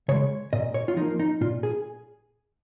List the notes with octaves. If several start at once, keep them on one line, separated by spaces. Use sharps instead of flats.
C#3 G#3 C#5
A#2 D#5
C#5
F4
F3 A#3 D#4
D#4
A#2 F4
G#4